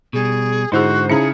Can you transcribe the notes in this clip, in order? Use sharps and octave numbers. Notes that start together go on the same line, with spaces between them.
B2 G3 G#4
G#2 D3 D#4 E4 F#4 G#4 C5
C#3 C#4 D#4 E4 G#4 A#5 C#7